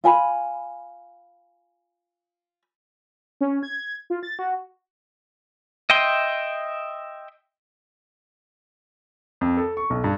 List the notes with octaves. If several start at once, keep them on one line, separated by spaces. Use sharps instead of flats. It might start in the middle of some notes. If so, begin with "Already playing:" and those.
F4 G#5 B5
C#4
G#6
F4
A6
F#4
D#5 E5 G5 C6
F2
A4
C#6
B1
G2